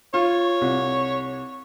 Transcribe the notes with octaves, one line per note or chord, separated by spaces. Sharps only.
F4 C#5
C2